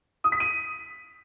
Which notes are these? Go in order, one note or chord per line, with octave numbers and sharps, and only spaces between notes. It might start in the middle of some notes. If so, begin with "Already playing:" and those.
D#6
B6
D#7